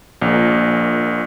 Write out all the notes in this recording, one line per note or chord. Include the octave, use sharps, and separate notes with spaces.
A#1 A#2